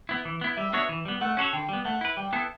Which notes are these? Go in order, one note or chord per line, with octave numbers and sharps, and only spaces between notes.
B3 E4
E3
B3 E4
G3 E5
B3 D4 F#4 C#5
E3
G3 B3
A3 F#5
C#4 F#4 A4 C#5
D3 G5
G3 B3
A3 F#5
E4 B4
G3 G5
B3 E4 A4